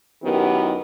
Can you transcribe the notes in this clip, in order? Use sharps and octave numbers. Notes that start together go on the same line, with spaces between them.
F#2 D#3 B3 E4 G4